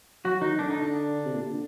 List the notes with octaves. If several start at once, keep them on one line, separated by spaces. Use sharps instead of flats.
F#3 F#4
D#3 D#4
D3 D4
D#4
D4
C3
A#2
D3